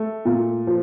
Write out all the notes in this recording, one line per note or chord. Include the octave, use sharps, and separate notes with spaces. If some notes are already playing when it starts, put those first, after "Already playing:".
Already playing: A3
A#2
F3